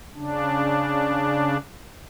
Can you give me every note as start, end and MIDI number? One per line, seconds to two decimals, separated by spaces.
0.15 1.57 49
0.15 1.57 62